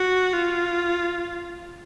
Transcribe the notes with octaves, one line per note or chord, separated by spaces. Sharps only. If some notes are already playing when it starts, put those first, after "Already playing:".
Already playing: F#4
F4